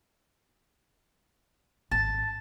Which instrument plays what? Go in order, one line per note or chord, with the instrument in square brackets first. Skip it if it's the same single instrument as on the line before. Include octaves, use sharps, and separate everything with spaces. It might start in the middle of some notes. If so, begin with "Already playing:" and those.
[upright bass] G#1 [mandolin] A5